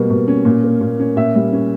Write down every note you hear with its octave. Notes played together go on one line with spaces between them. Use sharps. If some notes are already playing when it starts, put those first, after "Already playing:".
Already playing: B2 G3 A#3
B2
C#4
A#2
A#3
A#2
C#4
A#2 E5
G3
C#4